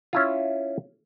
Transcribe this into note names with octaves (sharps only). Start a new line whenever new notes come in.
C#4 E4 F4